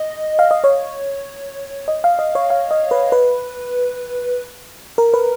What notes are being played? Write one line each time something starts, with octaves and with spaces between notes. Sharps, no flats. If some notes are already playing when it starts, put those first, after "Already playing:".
Already playing: D#5
F5
D#5
C#5
D#5
F5
D#5
C#5
F5
D#5
B4
B4
A#4
B4